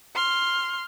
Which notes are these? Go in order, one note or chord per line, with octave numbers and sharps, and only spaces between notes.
C6 F6